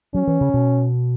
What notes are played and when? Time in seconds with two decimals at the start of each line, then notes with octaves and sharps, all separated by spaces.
0.14 F#3 C#4
0.27 E3
0.41 C#3
0.54 B2